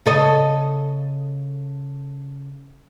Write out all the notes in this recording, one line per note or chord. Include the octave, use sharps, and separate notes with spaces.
C#3 A4 D#5